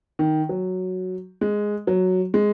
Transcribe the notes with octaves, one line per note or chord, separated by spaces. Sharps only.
D#3
F#3
G#3
F#3
G#3